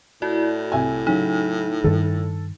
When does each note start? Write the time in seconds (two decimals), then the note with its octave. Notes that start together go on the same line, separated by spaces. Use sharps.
0.22 A2 E4 F#4 D5
0.72 C2 E5 G#5
1.07 C#3 F#3 D#4
1.84 G2 D#3 A4